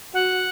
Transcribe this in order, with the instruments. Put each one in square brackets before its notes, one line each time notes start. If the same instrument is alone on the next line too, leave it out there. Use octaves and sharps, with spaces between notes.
[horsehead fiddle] F#4 [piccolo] F#5